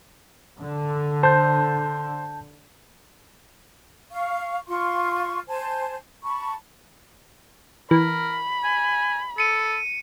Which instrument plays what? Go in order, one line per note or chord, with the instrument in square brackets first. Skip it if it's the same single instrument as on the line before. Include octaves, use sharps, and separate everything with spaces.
[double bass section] D3
[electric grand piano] C5 [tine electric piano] A5 G6
[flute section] F5 C#6
F4 F5 C6 C#6
C5 G#5 A5
A5 B5 C#6
[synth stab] E3 [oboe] A#4 [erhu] B5
[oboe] G#5
[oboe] A4 [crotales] C#7 D#7